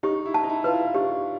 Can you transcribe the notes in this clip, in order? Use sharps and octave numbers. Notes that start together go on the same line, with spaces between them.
D#4 G4
E4
A5
D#4
E4
F4 B4
E4
D4 G4